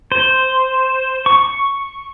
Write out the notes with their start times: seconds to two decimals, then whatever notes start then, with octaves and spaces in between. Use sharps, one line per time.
0.12 C5
1.26 C#6